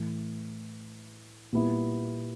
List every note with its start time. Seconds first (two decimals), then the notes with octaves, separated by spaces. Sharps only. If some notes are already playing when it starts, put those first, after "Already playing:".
Already playing: A2 E3 A3
1.53 A#2 G3 B3 E4